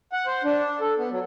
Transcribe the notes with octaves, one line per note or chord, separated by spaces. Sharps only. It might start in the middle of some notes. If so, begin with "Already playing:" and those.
F#5
C5
D4
A4
B3
F#3